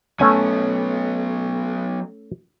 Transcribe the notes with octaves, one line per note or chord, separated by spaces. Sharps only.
F#3 A3 B3 C#4 G#5